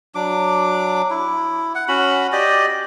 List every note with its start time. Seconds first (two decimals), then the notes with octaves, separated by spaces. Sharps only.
0.15 F#3 D4 D6
1.10 E4
1.75 F#5
1.88 C#4 F#4 B5
2.32 G4 D5 D#5